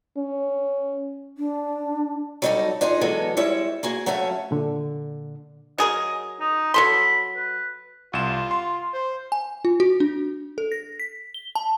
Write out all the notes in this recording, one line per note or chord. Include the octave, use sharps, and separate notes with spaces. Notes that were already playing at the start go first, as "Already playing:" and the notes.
C#4
D4
F#3 G3 D#4 F4 F#4 A4
D4 D#4 F4 G#4 A4
E3 F#3 G#3 B3 G#4 A4
G3 G#3 E4 C#5 E5
A#3 F#4 G#4
F#3 A3 C#4 E5 F5
A#2 D3
F#3 G#4 A#4 D#5
D#4
F#3 A4 B5 C6
B4
C2 F4 E7
C6
C5
G#5
F4
F#4
D4
A4
A#6
B6
G7
A5